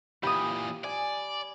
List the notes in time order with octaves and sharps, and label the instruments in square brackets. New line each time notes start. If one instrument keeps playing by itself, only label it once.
[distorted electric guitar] A#2 E3 [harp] G4 D#6 [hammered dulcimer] B5
[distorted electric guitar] D5 [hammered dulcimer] G#5